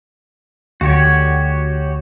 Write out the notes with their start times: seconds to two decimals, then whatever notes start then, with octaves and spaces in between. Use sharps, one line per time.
0.81 D2 F#4 G4 C#5